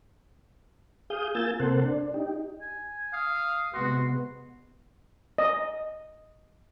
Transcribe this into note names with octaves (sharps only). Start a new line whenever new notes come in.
G#4 F5 D#6 G6
A#3 F4 G#5 E6 G6 A6
C3 A#3 A4 C5 F#5
D4
D#4 G4
G#5
F5 D#6
C3 G#3 B3 F#4 C6
D#5